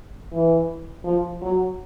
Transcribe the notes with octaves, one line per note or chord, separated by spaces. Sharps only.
E3
F3
F#3